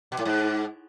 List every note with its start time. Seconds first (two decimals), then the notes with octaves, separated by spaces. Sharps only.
0.12 B2
0.19 A2
0.25 G#2